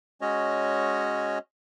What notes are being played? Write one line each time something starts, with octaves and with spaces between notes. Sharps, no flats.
G#3 C#4 F#4 C#5 D#5